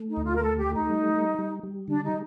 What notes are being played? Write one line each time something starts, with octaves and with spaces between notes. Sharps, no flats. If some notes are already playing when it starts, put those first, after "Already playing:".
Already playing: A3
D#4
D2
F4
A#4
A3 A4
G4
A3
D#4
G3
G3
G3
G3
D3 D4
D#4